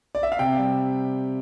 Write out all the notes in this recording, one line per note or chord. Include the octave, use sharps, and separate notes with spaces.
D5
E5
F5
C3 G5
G3